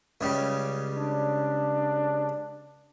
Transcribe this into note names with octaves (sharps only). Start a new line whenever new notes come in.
C#2 C#3 G3
D4